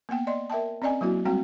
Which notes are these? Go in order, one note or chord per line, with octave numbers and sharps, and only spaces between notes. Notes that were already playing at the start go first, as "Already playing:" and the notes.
A#3 B3 F#5 G5
D5 D#5 C6
A#4 E5 G5 A5
C4 C#4 D5 D#5 G#5
F#3 A#3 E4 F#4
G3 G#3 C4 F#4 G5